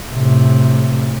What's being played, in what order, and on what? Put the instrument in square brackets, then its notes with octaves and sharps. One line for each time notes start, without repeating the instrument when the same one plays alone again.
[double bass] A2 C3